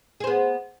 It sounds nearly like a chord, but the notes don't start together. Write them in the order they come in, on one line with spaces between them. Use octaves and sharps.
G#4 C5 B3